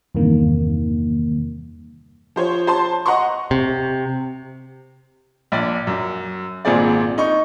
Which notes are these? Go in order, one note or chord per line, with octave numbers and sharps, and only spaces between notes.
E2 G2 C3 D#3 A#3
F3 C5 C#5
C5 A5 C6
D#5 F#5 A#5 C6 C#6
C3
A#1 D5
F#2
G#1 A#2 C4 G#4 D5
D#4 C#6